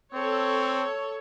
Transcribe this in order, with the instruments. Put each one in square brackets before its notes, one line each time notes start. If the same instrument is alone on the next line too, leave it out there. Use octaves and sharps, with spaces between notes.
[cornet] C4 [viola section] A4 C#5